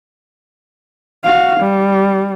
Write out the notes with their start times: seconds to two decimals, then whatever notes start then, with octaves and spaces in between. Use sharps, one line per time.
1.24 F#4 F5
1.59 G3